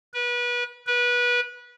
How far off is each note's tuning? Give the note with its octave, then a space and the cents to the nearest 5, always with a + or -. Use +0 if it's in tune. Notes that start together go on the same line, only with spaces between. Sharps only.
B4 -30
B4 -25